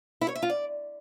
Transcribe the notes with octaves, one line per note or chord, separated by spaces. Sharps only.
E4
C#5
E5
F4
D5